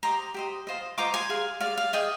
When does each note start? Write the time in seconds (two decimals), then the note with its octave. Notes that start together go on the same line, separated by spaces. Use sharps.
0.03 G4 C5 D#5 A#5 D6
0.34 G4 C5 D#5
0.67 F4 C5 D#5
0.98 F4 C5 D#5 A#5 D6
1.14 G#5 C6
1.29 G#4 D5 F5
1.61 G#4 D5 F5
1.77 F5
1.93 G#4 D5 D#5 G5